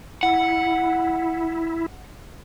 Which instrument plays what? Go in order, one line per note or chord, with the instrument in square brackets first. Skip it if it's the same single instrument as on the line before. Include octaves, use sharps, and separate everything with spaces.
[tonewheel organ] E4 [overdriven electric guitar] F#5